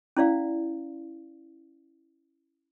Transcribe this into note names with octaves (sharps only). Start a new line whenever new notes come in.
C#4 E4 D5 F5